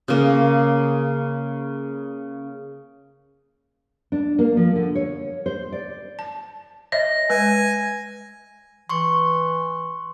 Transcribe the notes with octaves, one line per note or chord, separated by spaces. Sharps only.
C#3 A#3
D4
A#3
F3
D3
C#5
C5
D5
A5
C#5 D#5 E5 A#6
G#3 B4 G#5
E3 C6 C#6